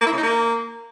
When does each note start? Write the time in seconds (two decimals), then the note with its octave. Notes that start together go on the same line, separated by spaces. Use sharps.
0.01 A#3
0.06 E4
0.12 C#3
0.17 D#4
0.23 A#3